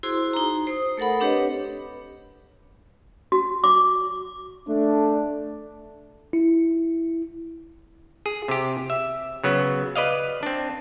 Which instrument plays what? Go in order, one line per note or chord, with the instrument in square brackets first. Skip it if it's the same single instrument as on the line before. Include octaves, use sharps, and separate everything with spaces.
[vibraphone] E4 F#4 G#4 C5 C6
D#4 A#5
C5 D#6
A3 A4 A#4 F#5 B5
C4 D4 G4 B4 C#5 D#5
[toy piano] F#4
D6
[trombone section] A3 D4
[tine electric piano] E4
[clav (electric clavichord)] G#4
C3 G4
E5
C#3 F#3 B3
B4 D5 D#5 F5
C4 D4